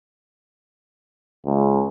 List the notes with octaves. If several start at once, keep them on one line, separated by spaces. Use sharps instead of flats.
C#2